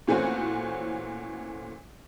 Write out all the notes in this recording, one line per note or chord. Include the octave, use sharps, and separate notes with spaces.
A#2 E3 A3 C4 C#4 F#4